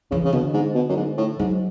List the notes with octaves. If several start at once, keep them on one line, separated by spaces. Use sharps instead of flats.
C#3 E3
C#3
B2 D3
G#2
B2
F#2
G#2
A2
G#2 F#3